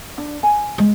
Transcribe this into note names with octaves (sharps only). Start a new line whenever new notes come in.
D4
G#5
G#3